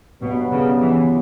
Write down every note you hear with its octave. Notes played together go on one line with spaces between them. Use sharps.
G2 B2 F#3 B3
C#3
E3